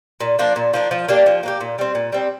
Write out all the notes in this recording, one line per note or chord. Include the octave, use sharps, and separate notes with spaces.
A#2
F3 A#3 D4
A#2
F3 A#3 D4
F3
A#3 D4 G4
F3
A#3 D4 G4
A#2
G3 C4
A#2
G3 C4